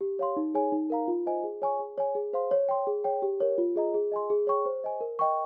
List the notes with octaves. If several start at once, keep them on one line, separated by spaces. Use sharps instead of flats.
G4
C#5 F5 C6
D#4
G#4 C#5 G#5
D#4
A#4 F5 A#5
F4
C5 D#5 G#5
G#4
C#5 G#5 C#6
G#4
C#5 G#5
G#4
C5 F5 C6
C#5
G5 C6
G#4
C#5 G5
G4
A#4 C#5
F4
G#4 D#5 A#5
G#4
D#5 G#5 C6
G#4
C#5 G5 C#6
C5
D#5 G#5
A#4
D#5 G5 C#6